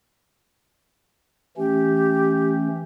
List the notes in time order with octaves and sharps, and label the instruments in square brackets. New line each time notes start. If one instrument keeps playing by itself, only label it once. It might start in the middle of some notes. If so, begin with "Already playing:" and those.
[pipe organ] E3 A3 C#4 [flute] G4